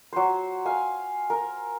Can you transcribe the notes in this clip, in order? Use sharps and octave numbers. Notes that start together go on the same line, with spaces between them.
F#3 C5
F5 G#5
A#4